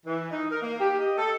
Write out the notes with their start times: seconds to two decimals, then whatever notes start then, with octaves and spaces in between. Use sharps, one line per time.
0.06 E3
0.31 D#4
0.51 A#4
0.62 A#3
0.80 G4
0.99 D#5
1.17 A4